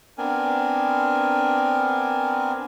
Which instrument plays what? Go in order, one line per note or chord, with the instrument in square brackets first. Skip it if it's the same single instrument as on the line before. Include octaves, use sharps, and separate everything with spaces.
[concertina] B3 C4 D4 A#4 G#5